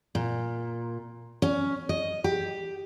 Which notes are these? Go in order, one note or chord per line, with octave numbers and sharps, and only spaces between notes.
A#2
C#4
D#5
G4